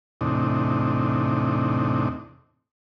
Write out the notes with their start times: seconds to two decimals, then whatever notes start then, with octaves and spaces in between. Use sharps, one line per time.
0.21 E2 A2 C3 D4 D#4